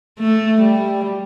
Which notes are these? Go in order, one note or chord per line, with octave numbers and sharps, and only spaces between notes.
A3
G3